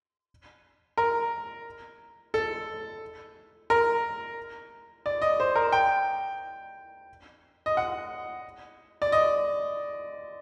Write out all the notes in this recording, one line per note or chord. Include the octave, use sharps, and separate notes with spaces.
A#4
A4
A#4
D5
D#5
C5
A#4
G5
D#5
F#5
D5
D#5